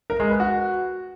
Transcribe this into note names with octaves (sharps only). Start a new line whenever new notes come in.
A#4
G#3
B4
F#4